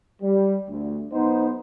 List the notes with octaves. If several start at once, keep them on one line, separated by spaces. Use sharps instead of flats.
G3
D2
B1 B3 D#4 C5